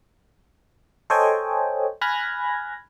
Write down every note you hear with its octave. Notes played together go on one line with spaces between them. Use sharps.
A4 C5 C#5 D#5 G5 G#5
G#5 B5 F6 F#6 G#6 A#6